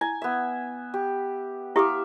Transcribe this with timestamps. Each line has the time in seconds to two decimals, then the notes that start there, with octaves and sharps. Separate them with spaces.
0.01 E4 G#5
0.22 B3 E5
0.94 G4
1.76 E4 G4 E5 F5 D6 D#6